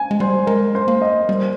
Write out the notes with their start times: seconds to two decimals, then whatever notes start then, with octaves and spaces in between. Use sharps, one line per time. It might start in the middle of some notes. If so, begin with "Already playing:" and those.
Already playing: G#5
0.11 G#3
0.20 G3 C5
0.47 G#3 A#4
0.75 C5
0.88 A#3
1.02 D#5
1.29 G3 C5